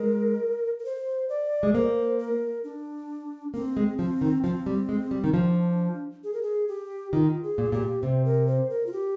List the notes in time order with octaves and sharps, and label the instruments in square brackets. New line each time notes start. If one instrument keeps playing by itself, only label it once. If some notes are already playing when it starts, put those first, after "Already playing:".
Already playing: [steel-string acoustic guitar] G#3 [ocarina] A#4
[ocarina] A#4
C5
D5
[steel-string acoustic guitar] G#3
[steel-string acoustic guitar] A#3 [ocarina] C5
[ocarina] A#4
D4
[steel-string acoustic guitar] A#3 [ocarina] C4
[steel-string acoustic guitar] G#3
[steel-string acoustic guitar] F3 [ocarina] C4
[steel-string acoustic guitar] D#3
[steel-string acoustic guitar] F3 [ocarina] C4
[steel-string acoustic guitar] G3
G#3
G3
D#3
[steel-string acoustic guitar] F3 [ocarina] D4
[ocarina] G#4
A#4
G#4
G4
[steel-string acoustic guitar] D#3 [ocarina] F4
[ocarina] G#4
[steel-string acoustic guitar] A#2
[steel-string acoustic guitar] A#2 [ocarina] G4
[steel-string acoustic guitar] C3 [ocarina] C5
[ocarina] A#4
C5
A#4
F4
G4